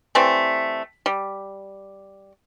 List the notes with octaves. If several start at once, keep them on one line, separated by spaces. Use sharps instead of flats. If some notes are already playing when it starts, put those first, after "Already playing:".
E3 G3 A3 C4
G3